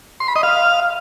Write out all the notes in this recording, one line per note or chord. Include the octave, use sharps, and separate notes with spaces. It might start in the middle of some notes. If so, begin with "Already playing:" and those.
C6
B5
D#5
F5